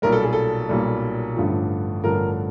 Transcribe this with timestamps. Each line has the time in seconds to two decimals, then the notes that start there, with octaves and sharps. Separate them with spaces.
0.02 B1 A#2 G3 A#4
0.12 A4
0.23 G#4
0.33 A4
0.69 B1 A#2 G3
1.36 A1 G2 D3 F3
2.04 A1 G2 D3 F3 A#4